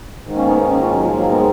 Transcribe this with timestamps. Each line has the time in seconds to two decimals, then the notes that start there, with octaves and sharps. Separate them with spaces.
0.24 G#2 D#3
0.36 A#3 C#4
0.46 B3 D#4
0.58 A#3 C#4
0.69 A#3 C#4
0.81 C#4 F4
0.93 F#3
0.99 A#3
1.03 F3 G#3
1.15 F#3 A#3
1.30 G#3 B3